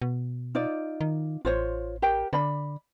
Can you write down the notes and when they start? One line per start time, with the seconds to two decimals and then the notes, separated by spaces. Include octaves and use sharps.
0.02 B2
0.55 D#4 F4 D5
1.01 D#3
1.45 A1 F4 C5 C#5
2.02 G4 A#4 G5
2.33 D3 D5 B5